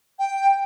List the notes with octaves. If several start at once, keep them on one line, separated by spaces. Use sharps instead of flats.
G5
G5